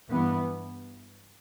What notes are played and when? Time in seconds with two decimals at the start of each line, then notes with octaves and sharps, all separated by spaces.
0.12 G2 E3 B3